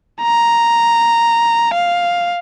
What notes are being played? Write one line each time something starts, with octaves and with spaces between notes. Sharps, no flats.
A#5
F5